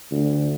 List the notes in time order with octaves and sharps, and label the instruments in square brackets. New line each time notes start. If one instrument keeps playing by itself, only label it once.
[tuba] D2